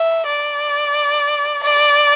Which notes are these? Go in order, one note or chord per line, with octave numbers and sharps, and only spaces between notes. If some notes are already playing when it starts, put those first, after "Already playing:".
Already playing: E5
D5
D5